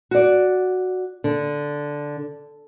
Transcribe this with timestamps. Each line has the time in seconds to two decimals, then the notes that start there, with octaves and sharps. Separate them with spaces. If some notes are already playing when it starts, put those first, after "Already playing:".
0.11 F#4 D5
1.24 D3